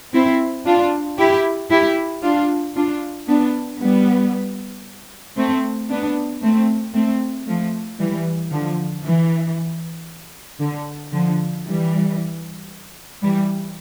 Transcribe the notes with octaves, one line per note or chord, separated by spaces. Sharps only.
C4 E4
D4 F4
E4 G4
E4 G4
D4 F4
D4 F4
B3 D4
G3 B3
A3 C4
B3 D4
A3 C4
A3 C4
F3 A3
E3 G3
D3 F3
E3
D3
D3 F3
E3 G3
E3 G3